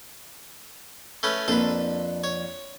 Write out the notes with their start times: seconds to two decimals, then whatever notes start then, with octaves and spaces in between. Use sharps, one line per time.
1.23 A3 C#4 B4
1.48 F2 A#3 D4 A4 B4
2.24 C#5